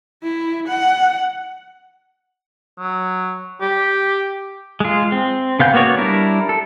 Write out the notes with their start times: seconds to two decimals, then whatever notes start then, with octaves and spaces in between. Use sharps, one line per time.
0.23 E4
0.68 F#5
2.79 F#3
3.61 G4
4.80 G#3 F4
5.12 C4
5.59 C#3 B3 F5 G6
5.74 A#3 B3 F#4 C#5 D5
5.98 G3 D4 E4 A#4
6.49 A4